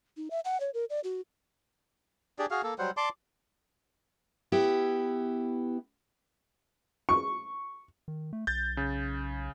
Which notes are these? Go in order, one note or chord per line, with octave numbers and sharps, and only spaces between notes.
D#4
E5
F#5
C#5
A#4
D5
F#4
D4 G4 G#4 D5
F#4 G#4 F5
A#3 A4
F#3 G3 C5 F#5
D5 A5 C6 D6
B3 E4 G4
C#6
D#3
A3
B1 G6 A6
C#3